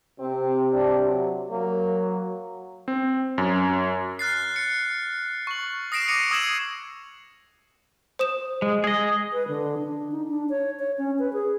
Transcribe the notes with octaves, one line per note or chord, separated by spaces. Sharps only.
C3 C4
D4
F#3
F#3 A#3
C4
F#2
F6 F#6 A6 C7
C#7
C#6 F#7
D#6 A#6 C7 D7 E7
D6 A#6 C7 C#7 D#7 F7
C#6 D#6 E6 G#6 E7 F#7
C5 D#6 E7
G#3
G#4 D#5
B4
D3
D4
D#4
D4
C#5
C#5
C#4
B4
G#4